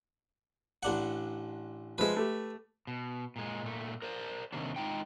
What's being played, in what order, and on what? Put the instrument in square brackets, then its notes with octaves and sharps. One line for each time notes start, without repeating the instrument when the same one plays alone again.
[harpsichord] A1 D4 F#5
[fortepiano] F3 G#3 [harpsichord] B4 E5
[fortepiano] A3 G4
[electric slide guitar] B2
A#2 G#3
A#2 A3
A#4 C5 D5
C3 D#3 A#3 C#4 D4
G#3 D#4 F4 G5